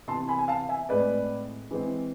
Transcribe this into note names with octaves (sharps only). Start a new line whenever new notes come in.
C3 E3 B3 A5 C6
G#5 B5
G#5
F5 A5
E5 G#5
A2 G#3 C4 B4 D5
E3 G#3 C4